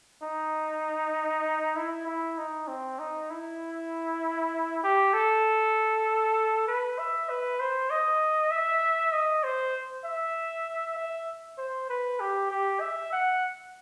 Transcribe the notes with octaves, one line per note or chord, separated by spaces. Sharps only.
D#4
E4
E4
D#4
C4
D#4
E4
G4
A4
B4
E5
B4
C5
D#5
E5
D#5
C5
E5
E5
C5
B4
G4
G4
E5
F#5